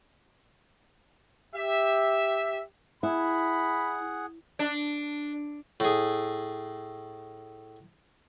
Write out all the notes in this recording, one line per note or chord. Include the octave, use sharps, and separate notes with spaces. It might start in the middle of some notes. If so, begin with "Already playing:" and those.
G4 E5
E4 G#4 F#5 B5
D4
A2 G#4